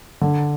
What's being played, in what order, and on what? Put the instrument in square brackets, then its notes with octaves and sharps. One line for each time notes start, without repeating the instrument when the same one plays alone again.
[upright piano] D3